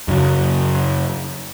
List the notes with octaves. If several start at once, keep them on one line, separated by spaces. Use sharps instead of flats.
F#2 C#3 F#3